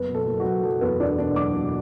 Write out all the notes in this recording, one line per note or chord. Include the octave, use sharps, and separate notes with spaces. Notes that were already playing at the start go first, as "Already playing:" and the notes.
Already playing: F#1 B3 B4
B2
A4
F#1
F#4
F#1
F#1 A4
E2 B3 B4
E2 D4 D5
B2 D4 D5
F#1 D5 D6
B2